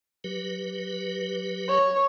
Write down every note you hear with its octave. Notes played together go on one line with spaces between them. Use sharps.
F#3 G4 B4
C#5